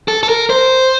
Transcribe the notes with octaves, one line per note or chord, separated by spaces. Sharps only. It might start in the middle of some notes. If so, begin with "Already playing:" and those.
A4
A4
A#4
C5